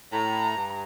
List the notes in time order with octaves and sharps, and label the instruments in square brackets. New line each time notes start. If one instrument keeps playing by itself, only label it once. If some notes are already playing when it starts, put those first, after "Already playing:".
[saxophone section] A2 [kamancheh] A#5
[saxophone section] G2